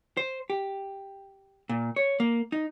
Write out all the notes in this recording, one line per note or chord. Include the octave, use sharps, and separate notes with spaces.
C5
G4
A#2
C#5
A#3
D#4